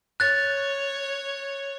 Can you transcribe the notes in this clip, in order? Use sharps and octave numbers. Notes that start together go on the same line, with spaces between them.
C#5 F#6 A6